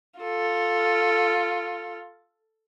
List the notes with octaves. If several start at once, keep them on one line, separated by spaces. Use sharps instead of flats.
F4 A4